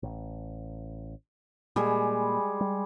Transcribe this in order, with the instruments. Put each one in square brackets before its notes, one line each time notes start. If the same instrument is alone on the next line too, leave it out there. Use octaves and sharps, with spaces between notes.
[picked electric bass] A1
[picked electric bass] A#2 [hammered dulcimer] G3 G#3 G#5
[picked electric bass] G3